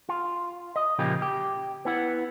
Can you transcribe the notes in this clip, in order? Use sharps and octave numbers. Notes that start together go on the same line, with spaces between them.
F4
D#5
A#2 C#3 F3 A#3 F4 G4
G4
B3 E4 F#5